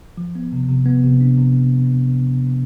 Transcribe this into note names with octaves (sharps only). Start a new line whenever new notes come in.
F3
B3
C3
C3
B3
C3
D4
C3